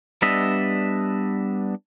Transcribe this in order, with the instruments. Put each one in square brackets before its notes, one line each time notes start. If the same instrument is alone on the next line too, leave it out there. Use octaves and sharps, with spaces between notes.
[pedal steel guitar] G3 B3 D4 D#5 E5